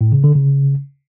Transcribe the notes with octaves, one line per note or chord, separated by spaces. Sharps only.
A2
C#3
D3
C#3